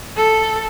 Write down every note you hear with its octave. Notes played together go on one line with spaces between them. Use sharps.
A4